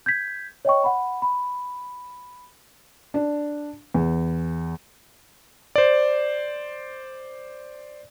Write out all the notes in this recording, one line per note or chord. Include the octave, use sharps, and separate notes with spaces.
G6 G#6 B6
C#5 D#5 G5 C#6
F#5 B5
B5
D4
E2
C5 D5